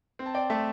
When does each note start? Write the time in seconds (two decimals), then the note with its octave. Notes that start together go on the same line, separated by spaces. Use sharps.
0.19 C4
0.26 A5
0.34 D5 G5
0.50 A3 E5 A5